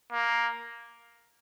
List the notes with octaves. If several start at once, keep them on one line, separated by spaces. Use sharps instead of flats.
A#3